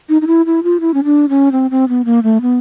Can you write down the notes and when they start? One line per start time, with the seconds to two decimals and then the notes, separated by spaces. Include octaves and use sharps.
0.09 D#4
0.22 D#4
0.27 E4
0.46 E4
0.63 F4
0.80 E4
0.94 C#4
1.04 D4
1.29 C#4
1.52 C4
1.71 C4
1.89 B3
2.05 A#3
2.23 A3
2.41 B3